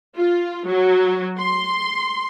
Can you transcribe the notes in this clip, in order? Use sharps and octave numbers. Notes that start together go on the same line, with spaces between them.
F4
F#3
C6